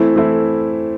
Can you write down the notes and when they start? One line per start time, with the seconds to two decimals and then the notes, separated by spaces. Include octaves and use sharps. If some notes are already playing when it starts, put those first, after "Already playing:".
Already playing: E3 A3 C4 E4
0.16 E3 A3 C4 E4